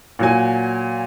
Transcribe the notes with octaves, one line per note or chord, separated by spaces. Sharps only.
A#2 F#3 G#5